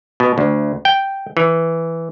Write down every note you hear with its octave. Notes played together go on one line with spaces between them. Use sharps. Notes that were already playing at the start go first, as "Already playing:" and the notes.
B2
D2
G5
E3